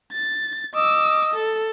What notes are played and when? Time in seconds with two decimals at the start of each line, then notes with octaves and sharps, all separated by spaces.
0.13 A6
0.75 D#5 D6 E6
1.34 A4